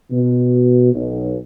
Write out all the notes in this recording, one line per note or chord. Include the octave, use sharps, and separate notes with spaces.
B2
B1